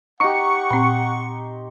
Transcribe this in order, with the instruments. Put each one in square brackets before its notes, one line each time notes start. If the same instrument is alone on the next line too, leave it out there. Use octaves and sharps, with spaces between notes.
[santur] D#4 G4 [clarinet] F#5 [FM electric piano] C#6 C#7
[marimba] A#2 C4 [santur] C6